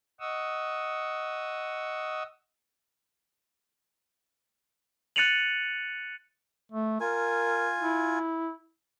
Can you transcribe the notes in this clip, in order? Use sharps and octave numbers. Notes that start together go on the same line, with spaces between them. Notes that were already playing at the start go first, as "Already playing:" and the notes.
D#5 F#5 C#6 D#6 E6
F#6 A6 C#7 D#7 F7 F#7
A3
F4 A#4 G#5
E4